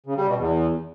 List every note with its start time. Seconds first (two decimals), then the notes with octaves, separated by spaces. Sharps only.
0.06 C#3
0.17 G3
0.27 B2
0.38 E2